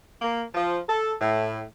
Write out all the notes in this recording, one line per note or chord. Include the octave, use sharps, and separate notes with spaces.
A#3
F3
A4
A2